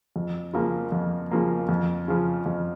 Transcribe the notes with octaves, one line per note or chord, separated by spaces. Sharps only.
F2
C#3 F3 A#3
F2
C#3 F3 A#3
F2
C#3 F3
F2